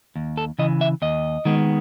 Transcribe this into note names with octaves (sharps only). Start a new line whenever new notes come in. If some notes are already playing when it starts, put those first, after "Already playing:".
D#2
A4
C#3 E3 D#5
E5
D#2 D#5
D#3 G#3 B3